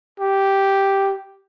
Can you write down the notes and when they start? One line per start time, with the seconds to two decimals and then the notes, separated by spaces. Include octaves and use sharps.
0.20 G4